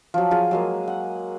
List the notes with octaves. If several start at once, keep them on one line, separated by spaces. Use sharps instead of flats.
F3 F#3
F4 G#4
F#3 G#3 A#3
F#5